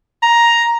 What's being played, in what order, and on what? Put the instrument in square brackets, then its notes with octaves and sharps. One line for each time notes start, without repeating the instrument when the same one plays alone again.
[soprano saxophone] A#5